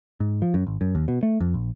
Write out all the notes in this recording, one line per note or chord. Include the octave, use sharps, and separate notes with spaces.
G#2
F3
F#2
G#1
F#2
D#2
B2
A3
F2
A#1